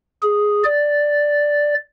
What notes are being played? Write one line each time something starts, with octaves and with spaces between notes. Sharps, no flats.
G#4
D5